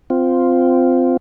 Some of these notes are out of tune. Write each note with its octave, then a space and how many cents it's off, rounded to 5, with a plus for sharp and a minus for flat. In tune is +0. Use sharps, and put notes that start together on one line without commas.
C4 -15 F4 +0